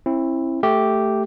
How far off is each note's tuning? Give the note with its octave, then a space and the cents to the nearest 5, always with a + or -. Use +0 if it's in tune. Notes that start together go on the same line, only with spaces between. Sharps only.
C4 +35 E4 +0
A3 +0 G4 -5